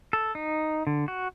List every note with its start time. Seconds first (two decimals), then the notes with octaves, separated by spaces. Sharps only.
0.13 A4
0.35 D#4
0.87 D3
1.08 F#4